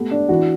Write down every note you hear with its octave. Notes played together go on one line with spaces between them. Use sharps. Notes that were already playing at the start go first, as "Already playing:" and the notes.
Already playing: A3 B3 G4
D4
E3 F#4